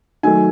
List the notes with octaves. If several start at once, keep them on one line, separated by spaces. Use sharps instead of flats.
D#3 F#3 A3 G#5